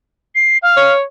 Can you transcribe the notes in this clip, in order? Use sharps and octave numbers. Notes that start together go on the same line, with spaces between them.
C7
F5
C#5